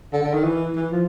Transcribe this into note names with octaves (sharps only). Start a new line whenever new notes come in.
D3
D3
D#3
E3
E3
F3